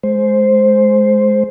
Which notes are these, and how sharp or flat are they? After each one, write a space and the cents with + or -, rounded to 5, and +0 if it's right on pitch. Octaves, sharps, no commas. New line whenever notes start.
G#3 +20 C5 +0